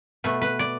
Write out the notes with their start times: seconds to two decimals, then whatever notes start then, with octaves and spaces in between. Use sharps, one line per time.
0.24 B2 A3 B4
0.42 B4
0.59 D5